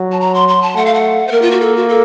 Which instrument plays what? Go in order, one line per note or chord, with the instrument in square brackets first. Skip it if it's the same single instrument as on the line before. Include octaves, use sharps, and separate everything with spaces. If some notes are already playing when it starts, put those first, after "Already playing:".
Already playing: [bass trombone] F#3
[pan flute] A5
A#5
C6
C6
A5
[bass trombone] A3 [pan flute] F#5
[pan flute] F5
F#5
C5
[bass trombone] A#3 [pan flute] A#4
[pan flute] F4
F#4
A4
F#4
A4